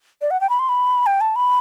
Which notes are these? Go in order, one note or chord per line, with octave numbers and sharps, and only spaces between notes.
D5
F#5
G5
B5
C6
B5
G5
A5
B5